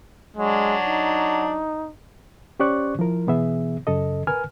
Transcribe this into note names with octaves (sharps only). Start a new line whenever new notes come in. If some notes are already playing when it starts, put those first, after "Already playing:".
F#3 G#3 D4
D#4
C#4 G4 C5 D5 C#6 F#6
F3 E4 A#4
B2 E3 B3 G#4 E5
F#2 C#3 A4 D#5
A#4 B4 G#5 F6